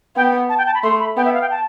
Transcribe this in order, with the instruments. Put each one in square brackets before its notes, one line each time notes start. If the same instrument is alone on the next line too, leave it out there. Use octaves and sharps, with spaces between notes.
[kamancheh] B3 [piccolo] G5
[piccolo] A5
G5
A5
B5
[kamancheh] A3 [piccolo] C6
[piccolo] B5
[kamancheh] B3 [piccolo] G5
[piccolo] E5
F5
G5
A5